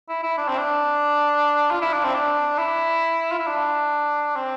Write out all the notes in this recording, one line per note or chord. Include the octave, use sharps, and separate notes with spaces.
E4
E4
D4
C4
D4
F4
E4
D4
C4
D4
E4
F4
E4
D4
C4